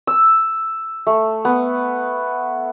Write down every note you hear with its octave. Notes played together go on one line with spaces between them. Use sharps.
E6
A3
B3